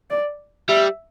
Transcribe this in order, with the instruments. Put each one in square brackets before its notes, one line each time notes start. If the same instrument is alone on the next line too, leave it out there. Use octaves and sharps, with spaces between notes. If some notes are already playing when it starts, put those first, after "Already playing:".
[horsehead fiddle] D5
[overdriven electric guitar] G3 [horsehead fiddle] E5